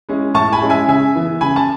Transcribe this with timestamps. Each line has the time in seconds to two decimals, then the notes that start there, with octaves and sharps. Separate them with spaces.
0.09 G#3 C#4 E4
0.34 A2 A5 C#6
0.52 G#5 B5
0.62 G#3 C#4 E4
0.70 E5 G#5
0.88 C#3 E5 G#5
1.15 E3 B3
1.41 C#3 G#5 B5
1.56 A5